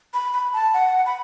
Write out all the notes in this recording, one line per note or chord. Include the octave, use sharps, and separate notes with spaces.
B5
B5
A5
F#5
B5